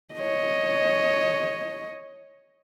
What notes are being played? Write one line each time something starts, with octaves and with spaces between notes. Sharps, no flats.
C#5 D#5